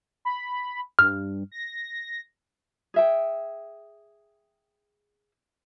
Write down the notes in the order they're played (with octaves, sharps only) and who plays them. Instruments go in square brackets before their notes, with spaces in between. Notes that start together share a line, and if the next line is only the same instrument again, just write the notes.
[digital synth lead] B5
[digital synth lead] G2 [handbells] F6
[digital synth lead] A#6
[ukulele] G#4 E5 G5